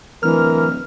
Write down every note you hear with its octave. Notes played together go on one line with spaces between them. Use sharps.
D1 E3 A#4 F6